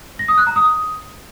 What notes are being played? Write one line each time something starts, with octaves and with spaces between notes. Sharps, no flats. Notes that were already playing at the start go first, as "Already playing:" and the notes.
A#6
D#6
F#6
A#5
D#6